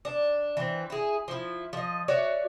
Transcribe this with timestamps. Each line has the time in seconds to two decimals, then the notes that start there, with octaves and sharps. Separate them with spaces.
0.05 D4
0.57 E3 C4
0.90 E4 G#4
1.28 F3 E4
1.73 F3 D#5
2.08 F#4 C#5 D5 E5